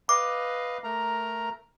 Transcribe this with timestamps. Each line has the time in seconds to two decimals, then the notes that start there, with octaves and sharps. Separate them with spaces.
0.09 B4 D#5 F5 D6
0.84 A3 A#4 A#5